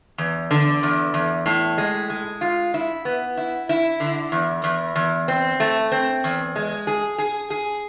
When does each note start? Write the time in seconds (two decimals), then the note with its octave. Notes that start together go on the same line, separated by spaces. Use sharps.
0.18 E2
0.51 D3
0.83 E2
1.14 E2
1.46 A2
1.78 G#3
2.10 G#3
2.41 F4
2.74 E4
3.05 B3
3.37 E4
3.69 E4
4.00 D3
4.32 E2
4.64 E2
4.96 E2
5.28 C4
5.60 A3
5.92 C4
6.24 E2
6.56 G#3
6.87 G#4
7.18 G#4
7.50 G#4